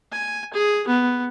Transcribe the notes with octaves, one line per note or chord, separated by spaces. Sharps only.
G#5
G#4
B3